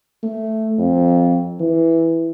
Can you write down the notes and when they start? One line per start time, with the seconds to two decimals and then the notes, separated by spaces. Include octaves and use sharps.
0.23 A3
0.78 F2
1.59 E3